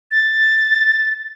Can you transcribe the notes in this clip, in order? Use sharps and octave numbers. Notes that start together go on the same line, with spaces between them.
A6